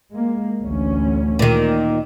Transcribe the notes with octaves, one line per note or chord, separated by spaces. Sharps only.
G#3 A#3
A1 D2 C#4
A#2 D#3